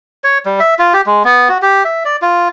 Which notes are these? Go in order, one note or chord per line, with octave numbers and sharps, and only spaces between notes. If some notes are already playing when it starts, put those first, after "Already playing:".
C#5
G3
E5
F4
G4
G#3
B3
F#4
G4
E5
D5
F4